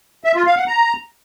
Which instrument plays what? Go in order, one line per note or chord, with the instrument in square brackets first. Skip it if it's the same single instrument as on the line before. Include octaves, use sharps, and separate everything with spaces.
[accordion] E5
F4
F5
F#5
A#5